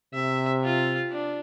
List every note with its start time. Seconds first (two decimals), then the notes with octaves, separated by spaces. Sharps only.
0.14 C3 E5
0.64 F4
1.12 D4